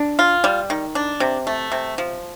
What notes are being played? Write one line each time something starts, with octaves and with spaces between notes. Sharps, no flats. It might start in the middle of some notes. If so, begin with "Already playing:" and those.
Already playing: D4
F4
G3
D#3
D4
C3
A3
C3
F3